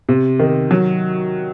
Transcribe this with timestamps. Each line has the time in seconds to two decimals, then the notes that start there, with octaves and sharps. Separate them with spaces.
0.09 C3
0.39 D#3
0.71 F#3